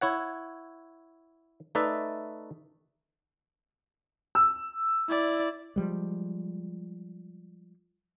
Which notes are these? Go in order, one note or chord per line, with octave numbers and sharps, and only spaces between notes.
E4 C#5 F#5
A3 D#4 B4 D5 E5
E6
E4 D5
F3 G3 G#3